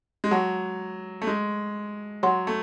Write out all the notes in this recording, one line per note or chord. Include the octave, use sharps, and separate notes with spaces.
G#3
F#3 F#5 A5 C#6
A3
G#3
F#3 C#5 F#5 C6
A3